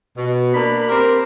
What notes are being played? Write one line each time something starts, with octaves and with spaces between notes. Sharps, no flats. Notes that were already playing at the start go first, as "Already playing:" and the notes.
B2
A#3 D4 B5
C4 G4 A#4